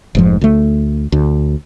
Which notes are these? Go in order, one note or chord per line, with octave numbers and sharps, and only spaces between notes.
F1 G#2 F3
D2 A3
D2